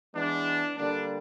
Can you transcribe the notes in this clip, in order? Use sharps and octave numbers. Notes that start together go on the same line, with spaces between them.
E3 G#3 B3 D4
D3 G3 A#3 D4